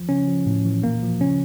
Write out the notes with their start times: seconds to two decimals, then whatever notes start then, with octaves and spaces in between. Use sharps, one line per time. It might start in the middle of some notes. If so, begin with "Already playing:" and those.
Already playing: F3
0.09 C#3 C#4
0.27 F3
0.46 A2
0.65 E3
0.83 A#2 A#3
1.02 F3
1.21 C#3 C#4